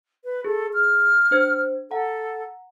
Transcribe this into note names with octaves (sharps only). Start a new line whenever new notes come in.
B4
G#4 A4
F6
D4 C5 G#6
A4 F#5 A#5